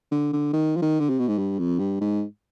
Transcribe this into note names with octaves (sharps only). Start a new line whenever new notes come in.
D3
D3
D#3
F3
D#3
D3
C3
B2
G#2
G2
F2
G2
G#2